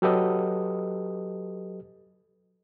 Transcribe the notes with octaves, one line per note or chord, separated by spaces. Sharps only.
F#3 G4 A4 B4 D#5